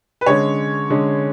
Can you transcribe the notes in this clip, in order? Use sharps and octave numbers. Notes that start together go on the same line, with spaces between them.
B4
D3 G#3 C#4 C#5
D3 G#3 C#4